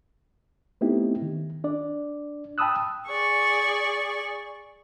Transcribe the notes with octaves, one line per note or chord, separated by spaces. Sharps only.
A3 B3 C4 D#4 E4 G4
D#3
D4 D5
G5 A5 B5 D#6 E6 F#6
G#4 D5 C#6